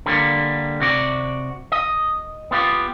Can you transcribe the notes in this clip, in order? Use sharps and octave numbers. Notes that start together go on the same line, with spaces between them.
D3 G3 A#3
C3 F#4 D5
D#5
B3 F4 G4